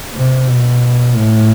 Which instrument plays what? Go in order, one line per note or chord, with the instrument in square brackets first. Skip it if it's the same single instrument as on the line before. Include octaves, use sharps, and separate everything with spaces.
[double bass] C3
B2
A2